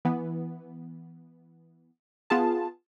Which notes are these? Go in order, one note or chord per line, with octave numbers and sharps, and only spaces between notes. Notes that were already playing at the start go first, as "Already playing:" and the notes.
E3 B3
B3 F4 G#4 A5